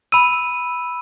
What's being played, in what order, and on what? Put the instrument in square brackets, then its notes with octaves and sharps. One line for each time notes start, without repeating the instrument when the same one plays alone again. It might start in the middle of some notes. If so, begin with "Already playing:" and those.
[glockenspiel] B5 E6 D#7